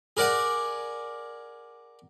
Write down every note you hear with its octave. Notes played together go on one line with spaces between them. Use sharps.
G#4 A#4 D5 F#5 G#5